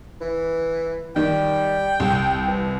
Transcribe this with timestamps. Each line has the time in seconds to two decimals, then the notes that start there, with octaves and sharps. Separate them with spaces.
0.21 E3
1.16 D#3 G3 G5
2.00 C2
2.47 E3